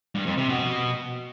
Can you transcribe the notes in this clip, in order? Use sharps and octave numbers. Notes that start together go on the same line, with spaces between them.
G2
F2
C3
B2